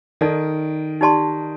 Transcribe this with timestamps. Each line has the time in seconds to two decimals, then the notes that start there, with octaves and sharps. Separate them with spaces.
0.21 D#3 D#4 A4 D5
1.01 D#4 G4 D5 A5 C6